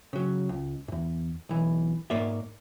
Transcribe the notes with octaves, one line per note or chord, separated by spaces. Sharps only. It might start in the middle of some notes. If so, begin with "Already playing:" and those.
C#3 F#3
C#2
E2 G#2
B1 E3
G#2 A#3 C#5 D5 E5